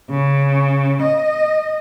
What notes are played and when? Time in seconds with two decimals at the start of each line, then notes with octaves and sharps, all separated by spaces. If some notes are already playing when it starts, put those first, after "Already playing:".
0.10 C#3
1.02 D#5